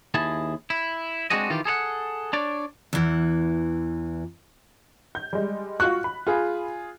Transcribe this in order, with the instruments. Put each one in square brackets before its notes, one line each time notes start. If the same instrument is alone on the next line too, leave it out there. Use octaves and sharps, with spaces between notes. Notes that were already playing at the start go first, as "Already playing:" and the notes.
[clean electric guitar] D#2 E4 G#4 A5
E4
G#3 C4 D4 F#4 G#4 D#5
D#3 E3 F4 G4
G#4 A4 C#5 F#5
D4 C#5 D5
[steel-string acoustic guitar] E2 E3
[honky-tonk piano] G6
G3 G#3
[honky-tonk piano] F4 F#4 C#6 [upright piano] F#6
[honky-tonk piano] B5
[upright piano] F4 G#4